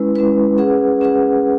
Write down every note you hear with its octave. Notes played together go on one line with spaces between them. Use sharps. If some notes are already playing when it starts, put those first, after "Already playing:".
Already playing: G#3 C#4 E4 B4
G#3 C#4 E4 B4
C#4 G#4 B4 F#5
C#4 G#4 B4 F#5